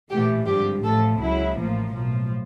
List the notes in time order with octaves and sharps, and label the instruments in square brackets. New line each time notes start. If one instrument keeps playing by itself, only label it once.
[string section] A#1 A2 E3 A3 G4
G#1 G2 D3 F3 G4
A1 A2 F3 A3 A4
C#2 C#3 F#3 E4
A1 A2 F3 A#3
B1 A2 F3